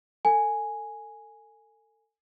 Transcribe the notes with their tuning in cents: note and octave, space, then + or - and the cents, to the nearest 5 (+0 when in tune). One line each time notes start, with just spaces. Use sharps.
A4 +30 G#5 +0